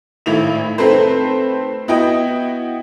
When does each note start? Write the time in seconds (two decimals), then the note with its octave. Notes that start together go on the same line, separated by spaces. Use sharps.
0.26 G#1 A2 D#3 E4 F7
0.78 D#3 A3 C4 A4 B4 C5
1.88 B3 E4 F#4 D#5 G5